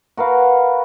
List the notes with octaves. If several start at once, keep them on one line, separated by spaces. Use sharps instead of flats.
F#4 A#4 B4 F5